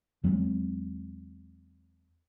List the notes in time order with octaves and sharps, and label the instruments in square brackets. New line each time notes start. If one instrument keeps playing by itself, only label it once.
[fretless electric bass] E2 F#3 G#3 C4